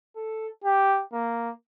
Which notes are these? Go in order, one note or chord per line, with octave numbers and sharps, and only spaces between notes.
A4
G4
A#3